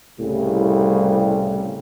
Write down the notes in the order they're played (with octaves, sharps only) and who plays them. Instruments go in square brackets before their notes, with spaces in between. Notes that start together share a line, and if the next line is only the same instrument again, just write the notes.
[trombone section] C2 A2 C#3 G3